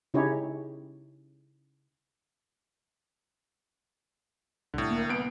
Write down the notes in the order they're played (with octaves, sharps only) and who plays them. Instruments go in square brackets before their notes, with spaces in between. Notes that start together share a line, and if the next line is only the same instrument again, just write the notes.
[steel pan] C#3 C#4 D#4 E4 G4 C#5
[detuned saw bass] C2 [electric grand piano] A2 D3
[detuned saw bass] A#3
[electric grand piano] C2 D7 [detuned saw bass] B3